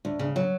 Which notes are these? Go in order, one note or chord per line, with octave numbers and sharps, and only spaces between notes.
D2
C#3
F#3